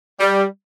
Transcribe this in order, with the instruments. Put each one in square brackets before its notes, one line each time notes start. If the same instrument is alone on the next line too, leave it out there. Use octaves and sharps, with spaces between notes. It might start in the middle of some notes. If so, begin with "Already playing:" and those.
[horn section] G3